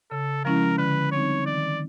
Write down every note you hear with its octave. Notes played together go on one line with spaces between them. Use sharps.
C#3 A4
F3 G#3 C#4 E4 A#4
D3 B4
G3 C4 D#4 C#5
D#3 D5